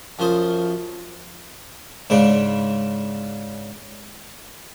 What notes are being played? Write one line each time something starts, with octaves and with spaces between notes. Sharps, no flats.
F#2 F3 C5 D#6
G#2 C#3 D4